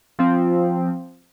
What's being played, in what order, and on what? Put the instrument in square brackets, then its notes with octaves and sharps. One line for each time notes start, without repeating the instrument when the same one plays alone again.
[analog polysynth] F3 C4